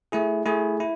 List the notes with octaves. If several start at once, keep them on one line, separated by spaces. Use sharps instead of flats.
A3 E4 G#4
A3 E4 G#4
E4